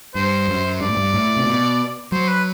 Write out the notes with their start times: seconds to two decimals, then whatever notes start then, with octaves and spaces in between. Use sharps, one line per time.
0.15 G2 C5
0.48 F#2
0.81 G2 D5
0.89 A2
0.96 G2
1.14 A2
1.37 C3
1.46 B2
2.12 F#3 C5
2.28 B4